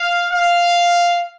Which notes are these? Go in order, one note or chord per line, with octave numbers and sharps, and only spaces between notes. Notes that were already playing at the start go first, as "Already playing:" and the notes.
Already playing: F5
F5